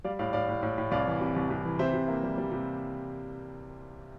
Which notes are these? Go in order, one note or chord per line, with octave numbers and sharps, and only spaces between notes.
G3 D5 F5
A2 D5 F5
A2 D5 F5
A2
A2
A2
C2 D5 F5
E3
C3
C2
C2
E3
C3 C5 E5
C3
A#3
G3
G3
C3